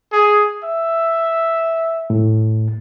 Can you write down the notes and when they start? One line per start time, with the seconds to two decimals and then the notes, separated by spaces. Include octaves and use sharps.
0.12 G#4
0.64 E5
2.10 A2